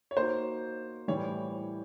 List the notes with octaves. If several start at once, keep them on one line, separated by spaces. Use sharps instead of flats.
C#5
A#3 D#4 F#4 C5
A2 E3 G3 C#5